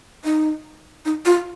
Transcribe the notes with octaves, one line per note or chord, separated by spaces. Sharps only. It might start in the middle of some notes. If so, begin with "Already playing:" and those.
D#4
D#4
F4